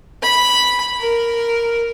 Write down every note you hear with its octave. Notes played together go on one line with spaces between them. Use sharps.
B5
A#4